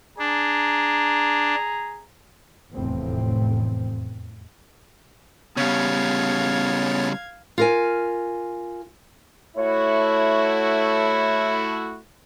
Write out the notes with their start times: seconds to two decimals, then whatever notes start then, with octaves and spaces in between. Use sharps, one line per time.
0.19 D4 G#4 A#5
2.73 F1 E2 A2 C4
5.57 C#3 G3 B3 C#5 F5 G#6 A6
7.58 F4 A#4 G#5
9.57 A3 E4 F#4 C#5